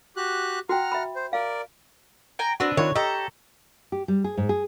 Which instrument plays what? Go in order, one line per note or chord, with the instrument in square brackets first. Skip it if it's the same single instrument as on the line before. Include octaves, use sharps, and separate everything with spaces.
[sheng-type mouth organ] F#4 G4 F#6
[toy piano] F#4 G5 [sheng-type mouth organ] F#5 A#5 F6
[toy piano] E5 B5
[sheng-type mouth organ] C5
[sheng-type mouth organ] A#4 D5 [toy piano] F5
[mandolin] G5 G#5 A#5
[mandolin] C4 D4 B4 [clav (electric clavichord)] F#4
[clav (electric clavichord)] D#3 F4 [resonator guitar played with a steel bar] C#5
[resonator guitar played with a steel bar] G4 [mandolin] A4 A#5 [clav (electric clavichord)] D#5
[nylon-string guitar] G4
G3
G#4
G#2
G#4